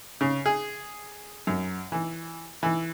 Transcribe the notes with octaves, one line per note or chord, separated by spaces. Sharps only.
C#3
G#4
F#2
E3
E3